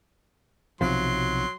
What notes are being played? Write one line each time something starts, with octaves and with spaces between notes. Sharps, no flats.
B1 C3 F3 F#3 C6